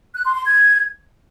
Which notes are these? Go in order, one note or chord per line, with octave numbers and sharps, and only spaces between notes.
F#6
C6
C6
G#6